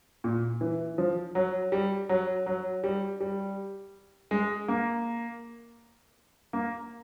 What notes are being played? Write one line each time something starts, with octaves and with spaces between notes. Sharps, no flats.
A#2
E3
F3
F#3
G3
F#3
F#3
G3
G3
G#3
A#3
A#3